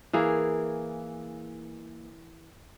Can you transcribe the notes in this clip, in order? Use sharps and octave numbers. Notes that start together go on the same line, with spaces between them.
E3 A#3 G#4